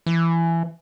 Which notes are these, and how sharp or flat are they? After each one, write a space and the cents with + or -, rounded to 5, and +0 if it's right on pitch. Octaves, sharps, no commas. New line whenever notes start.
E3 +20